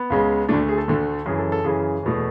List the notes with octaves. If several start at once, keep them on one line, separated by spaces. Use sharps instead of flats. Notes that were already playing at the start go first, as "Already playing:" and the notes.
Already playing: B3
C#2 C#3 G#3
D2 D3 A3 D4
G#4
A4
D2 D3 A3
F#2 C#3 E3 G#4
A4
A4
F#2 C#3 E3 G#4
E2 B2 A3